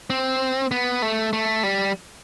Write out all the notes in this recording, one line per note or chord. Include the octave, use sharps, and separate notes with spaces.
C4
B3
A3
A3
G3